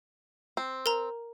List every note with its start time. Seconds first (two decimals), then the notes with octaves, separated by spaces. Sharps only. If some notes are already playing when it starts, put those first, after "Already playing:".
0.57 C4
0.86 A#4 A#5